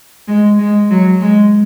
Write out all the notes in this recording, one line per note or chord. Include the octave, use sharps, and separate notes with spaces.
G#3
G#3
F#3
G#3